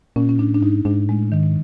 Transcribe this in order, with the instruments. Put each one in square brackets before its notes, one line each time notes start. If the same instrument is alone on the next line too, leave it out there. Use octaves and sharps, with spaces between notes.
[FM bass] A#2 [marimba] C#4
[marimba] C#4
[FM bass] A2 [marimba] D4
[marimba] D4
[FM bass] G#2 [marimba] D#4
[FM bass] G#2 [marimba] D4
[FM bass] A2 [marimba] G#3
[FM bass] G#2 [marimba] D#3